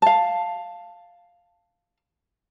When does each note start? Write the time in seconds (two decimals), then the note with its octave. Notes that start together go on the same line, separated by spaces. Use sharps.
0.02 F5 A5